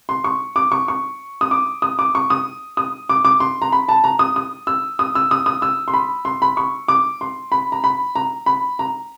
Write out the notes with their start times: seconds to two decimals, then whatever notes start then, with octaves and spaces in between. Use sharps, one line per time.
0.09 C6
0.24 C#6
0.56 D6
0.72 C#6
0.88 C#6
1.41 D#6
1.51 D6
1.82 D#6
1.99 D6
2.15 C#6
2.30 D#6
2.77 D#6
3.09 D6
3.25 D6
3.40 C6
3.62 A#5
3.73 B5
3.89 A5
4.04 A#5
4.19 D#6
4.36 D#6
4.67 E6
4.99 D#6
5.15 E6
5.31 D#6
5.46 D#6
5.62 E6
5.88 C6
5.94 B5
6.25 C6
6.42 B5
6.57 C#6
6.88 D6
7.21 C6
7.52 B5
7.72 A#5
7.84 B5
8.16 A#5
8.46 B5
8.79 A#5